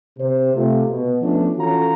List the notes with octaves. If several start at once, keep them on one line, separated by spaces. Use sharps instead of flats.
C3 C5
C3 A3 F4
B2
F3 A3 B3 C#4 D4
E3 C#4 F4 F#4 A4 A#5